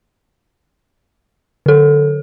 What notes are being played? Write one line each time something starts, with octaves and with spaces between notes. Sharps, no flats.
D3 A4